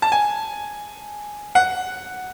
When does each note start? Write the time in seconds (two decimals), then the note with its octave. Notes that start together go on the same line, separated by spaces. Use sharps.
0.02 A5
0.12 G#5
1.55 F#5